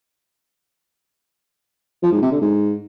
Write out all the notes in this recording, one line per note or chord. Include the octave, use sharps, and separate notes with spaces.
F3
G#2
C3
D3
G#2